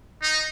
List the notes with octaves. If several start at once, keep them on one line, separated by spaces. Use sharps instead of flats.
D#4